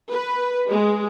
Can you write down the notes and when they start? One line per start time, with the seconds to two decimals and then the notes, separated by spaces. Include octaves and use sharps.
0.12 B4
0.69 G#3